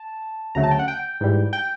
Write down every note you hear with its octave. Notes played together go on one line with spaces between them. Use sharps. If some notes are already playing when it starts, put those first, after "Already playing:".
Already playing: A5
D2 C#3 F#3 A3 A#5
A5
G5
F#5
G5
G#2 E3 G3
G5